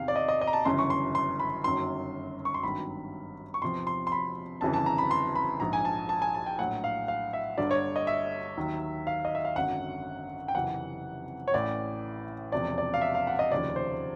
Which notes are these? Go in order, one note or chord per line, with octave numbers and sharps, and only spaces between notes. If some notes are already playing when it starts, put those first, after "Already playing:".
Already playing: E2 C3 D#3 F5
D5
D#5
D#5
D#5
A#5
A5
G1 F#2 C#3 E3 C6
C#6
C6
C6
B5
G1 F#2 D#3 F#3 C6
C#6
C6
G#1 G2 D#3 F#3 B5
C#6
E2 C3 F3 C6
C6
C6
B5
G1 F2 C#3 E3 A5
A5
A#5
B5
C6
B5
A#1 G#2 F3 A#5
G#5
A5
A5
G#5
A5
G5
A#1 A2 F#3 F#5
F5
F5
E5
G1 G2 D3 D5
C#5
D#5
E5
D#2 D#3 F#3
F5
D#5
E5
F5
G#1 F#2 D3 F#3 F#5
G5
F#1 F2 C3 E3 F#5
C#5
A1 A2 E3 D5
E1 E2 C3 F3 D5
D5
F5
E5
F5
F#5
D#5
F1 D#2 C#3 F3 D5
C5